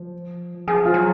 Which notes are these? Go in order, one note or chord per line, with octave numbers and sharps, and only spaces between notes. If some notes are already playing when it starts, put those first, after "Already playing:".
Already playing: F3
F3 G#4
F4
F#3